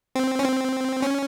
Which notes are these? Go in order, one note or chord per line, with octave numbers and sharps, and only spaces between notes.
C4
C#4
C4
C#4